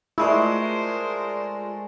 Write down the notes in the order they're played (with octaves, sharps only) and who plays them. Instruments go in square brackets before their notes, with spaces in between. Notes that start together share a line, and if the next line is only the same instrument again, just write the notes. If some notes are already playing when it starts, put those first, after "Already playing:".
[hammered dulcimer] G#3 A3 [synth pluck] E4 [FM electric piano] F4 G#4 D5 [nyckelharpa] A#4 C5